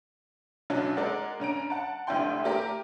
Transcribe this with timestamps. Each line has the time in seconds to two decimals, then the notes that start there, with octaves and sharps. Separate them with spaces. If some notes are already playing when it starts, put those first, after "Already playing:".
0.70 B1 F#3 C#4 D4
0.96 G#3 A#4 D5 F#5
1.40 G2 C#4 A#5 D7
1.70 F#5 A5
2.07 F1 C2 D3 E4 G5 C6
2.44 A3 G4 A#4